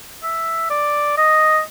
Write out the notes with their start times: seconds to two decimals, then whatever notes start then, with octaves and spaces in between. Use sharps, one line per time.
0.23 E5
0.70 D5
1.17 D#5